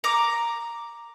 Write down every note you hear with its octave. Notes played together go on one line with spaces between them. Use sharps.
A#5 D6